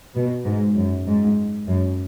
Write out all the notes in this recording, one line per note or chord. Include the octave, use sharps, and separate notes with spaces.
B2
G#2
F#2
G#2
F#2